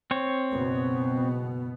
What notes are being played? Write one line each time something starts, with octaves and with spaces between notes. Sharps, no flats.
C4 C#5
F#1 B2 B3